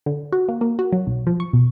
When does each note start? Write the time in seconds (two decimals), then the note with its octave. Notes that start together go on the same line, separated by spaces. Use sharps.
0.06 D3
0.32 F#4
0.49 A#3
0.61 A#3
0.79 F#4
0.92 F#3
1.07 B1
1.27 F3
1.40 C#6
1.53 B2